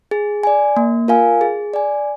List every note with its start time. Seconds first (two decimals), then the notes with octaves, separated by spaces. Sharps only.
0.11 G#4
0.43 D5 G#5
0.77 A#3
1.08 F4 A#4 F5 G#5
1.41 G#4
1.74 D5 G#5